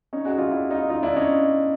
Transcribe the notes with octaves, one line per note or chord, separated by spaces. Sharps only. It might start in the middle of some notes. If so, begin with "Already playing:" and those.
C#4 D#4
F#4 G#4
F4 G4
E4 F#4
D#4 F4
D#4 F4
D4 E4
C#4 D#4